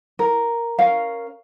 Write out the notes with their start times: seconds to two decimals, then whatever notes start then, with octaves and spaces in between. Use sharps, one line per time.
0.19 A#4
0.79 C#4 A#4 F5